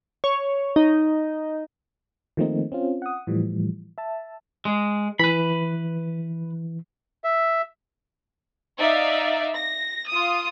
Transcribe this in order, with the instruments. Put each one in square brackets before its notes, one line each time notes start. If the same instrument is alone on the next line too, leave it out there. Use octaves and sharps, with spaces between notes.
[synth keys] C#5
D#4
[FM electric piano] D#3 F3 A3 A#3 C4 D#4
C4 C#4 F4
F#5 D#6
A2 E3 F3 G3
E5 A5
[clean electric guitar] G#3
[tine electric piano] E3 [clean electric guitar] B4 B5
[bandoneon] E5
[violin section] D#4 D5 E5 F5
A#6
F4 D#6